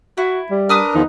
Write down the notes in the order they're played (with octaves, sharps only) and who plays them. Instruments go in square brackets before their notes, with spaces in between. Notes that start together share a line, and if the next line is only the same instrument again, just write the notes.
[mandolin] E4 [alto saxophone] F#4
[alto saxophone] G3
[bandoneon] D4 A#4 [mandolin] B4 D#6 F6
[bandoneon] E2 D#3 F3 [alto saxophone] D#4